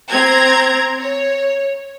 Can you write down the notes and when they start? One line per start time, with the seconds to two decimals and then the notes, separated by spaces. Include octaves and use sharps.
0.11 C4 A#5 G#6
1.00 C#5